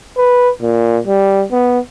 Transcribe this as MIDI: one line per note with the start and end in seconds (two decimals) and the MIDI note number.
0.17 0.50 71
0.62 0.98 46
1.07 1.44 55
1.52 1.79 59